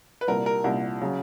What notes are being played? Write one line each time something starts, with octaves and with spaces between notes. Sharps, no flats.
B4
C2 A#2 G3 A#4
A#4
C2 A#2 G3
C#3 F#3